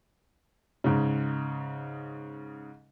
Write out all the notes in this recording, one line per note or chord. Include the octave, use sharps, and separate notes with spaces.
G#2 C#3